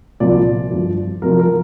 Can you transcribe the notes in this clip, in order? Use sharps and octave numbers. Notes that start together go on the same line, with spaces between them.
C2 A#2 F3 D5
G2 D3 F3
F2 C3 F3 A#4
A#4